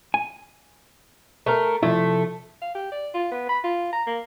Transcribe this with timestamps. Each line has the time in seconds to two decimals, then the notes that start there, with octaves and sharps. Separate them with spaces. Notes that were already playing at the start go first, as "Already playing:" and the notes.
0.14 G#5
1.46 A3 A#4
1.83 C3 F3 A3 E4
2.62 F5
2.75 G4
2.92 D5
3.14 F4
3.31 B3
3.49 B5
3.64 F4
3.93 A#5
4.07 A#3